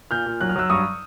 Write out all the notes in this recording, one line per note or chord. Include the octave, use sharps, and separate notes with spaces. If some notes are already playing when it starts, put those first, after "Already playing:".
A#2 F6 G6
A#2
F#3 F#6
F6
F#3 E6 F#6
G2 C#6 D#6